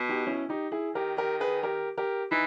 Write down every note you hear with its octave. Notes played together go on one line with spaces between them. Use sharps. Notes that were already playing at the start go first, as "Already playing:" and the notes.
Already playing: B2
D#4 G4
C#4 E4
D#4 G4
E4 G#4
D#3 G4 A#4
G4 A#4
G#4 B4
G4 A#4
G4 A#4
E3 D#4